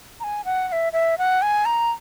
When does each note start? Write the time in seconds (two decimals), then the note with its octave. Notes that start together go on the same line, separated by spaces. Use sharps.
0.20 A#5
0.24 G#5
0.45 F#5
0.69 F#5
0.72 E5
0.93 E5
1.18 F#5
1.42 G#5
1.65 A#5